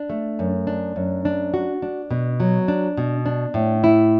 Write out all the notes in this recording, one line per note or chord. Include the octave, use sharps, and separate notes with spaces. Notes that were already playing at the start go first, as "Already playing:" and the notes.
Already playing: D4
A3
F#2
D4
F#2
D4
F#4
D4
B2
F#3
D4
B2
D4
A2
E4